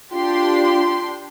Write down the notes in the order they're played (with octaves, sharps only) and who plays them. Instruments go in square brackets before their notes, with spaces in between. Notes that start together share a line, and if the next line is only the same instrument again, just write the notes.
[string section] D4 G4 C6 [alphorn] F4